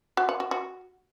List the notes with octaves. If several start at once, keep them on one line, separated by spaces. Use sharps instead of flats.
F#4
F#5
F#4
F#4